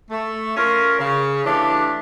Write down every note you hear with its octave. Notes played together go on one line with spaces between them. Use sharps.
A3
C#4 F4 A#4
C#3
E3 A3 D4 G4